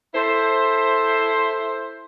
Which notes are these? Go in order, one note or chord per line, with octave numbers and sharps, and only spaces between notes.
E4 A4 C5